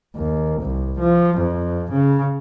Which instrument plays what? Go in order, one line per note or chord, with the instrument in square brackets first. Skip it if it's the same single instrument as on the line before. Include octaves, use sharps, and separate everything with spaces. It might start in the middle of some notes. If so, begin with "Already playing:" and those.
[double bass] D#2
C2
F3
F2
C#3